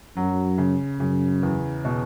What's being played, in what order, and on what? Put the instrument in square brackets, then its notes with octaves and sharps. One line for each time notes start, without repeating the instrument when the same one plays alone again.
[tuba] F#2 [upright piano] F#3
[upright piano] C#3
[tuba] F#2 [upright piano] C#3
[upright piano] E2
B2